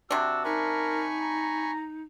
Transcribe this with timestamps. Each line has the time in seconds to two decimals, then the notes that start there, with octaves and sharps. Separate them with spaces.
0.11 C3 D4 F#4 E6
0.45 D#4 A#4 G#5 B5 C#6
1.18 A#5